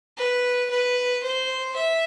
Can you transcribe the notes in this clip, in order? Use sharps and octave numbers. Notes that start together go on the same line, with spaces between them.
B4
B4
C5
E5